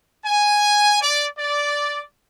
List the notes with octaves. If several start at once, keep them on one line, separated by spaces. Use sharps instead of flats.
G#5
D5
D5